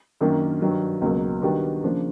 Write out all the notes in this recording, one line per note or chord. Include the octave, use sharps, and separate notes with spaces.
F#2 D#3 F#3 A#3 D4
G2 D#3 F#3
C#2 B2 F#3 A#3
D#3 G3 B3 D4 F#4
C#3 F3 A#3 D4